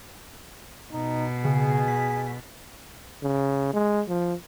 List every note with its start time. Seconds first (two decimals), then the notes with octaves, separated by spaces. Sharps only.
0.92 B2 D#4
1.45 C#3 G#4
1.88 B6
3.23 C#3
3.73 G#3
4.08 F3